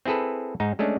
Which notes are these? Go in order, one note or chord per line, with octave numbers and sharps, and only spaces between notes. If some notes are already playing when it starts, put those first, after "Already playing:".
C4 E4 G#4 A4 B4
G#2 D#4
G#3 A3 C#4 D4